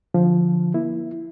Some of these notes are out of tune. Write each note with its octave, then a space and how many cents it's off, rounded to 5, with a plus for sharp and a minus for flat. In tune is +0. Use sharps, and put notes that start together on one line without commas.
D3 +0 F3 +0
A#3 +40 E4 +0